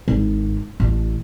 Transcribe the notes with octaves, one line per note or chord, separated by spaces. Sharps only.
G#1
A1